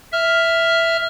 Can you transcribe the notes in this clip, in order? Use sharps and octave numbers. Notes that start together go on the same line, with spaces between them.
E5 F6